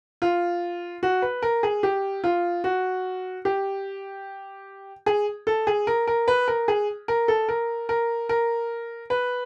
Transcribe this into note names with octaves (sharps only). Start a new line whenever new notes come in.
F4
F#4
B4
A#4
G#4
G4
F4
F#4
G4
G#4
A4
G#4
A#4
A#4
B4
A#4
G#4
A#4
A4
A#4
A#4
A#4
B4